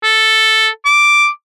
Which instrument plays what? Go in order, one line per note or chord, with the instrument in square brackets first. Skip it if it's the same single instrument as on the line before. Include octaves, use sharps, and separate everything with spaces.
[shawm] A4
D6